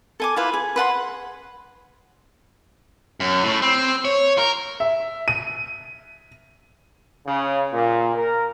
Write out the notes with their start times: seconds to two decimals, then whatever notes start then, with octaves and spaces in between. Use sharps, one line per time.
0.20 A4 G#5 D6
0.36 E4 F4 B4
0.54 G#4
0.76 B4 F#5 A5 C6
3.20 F#2
3.43 A2
3.62 C4
4.05 C#5
4.38 A#4
4.80 E5
5.28 D#7
7.26 C#3
7.72 A#2
8.15 A#4